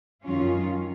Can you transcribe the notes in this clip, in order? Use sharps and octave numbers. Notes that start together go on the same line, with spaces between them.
F#2 D#3 F#3 C#4 F4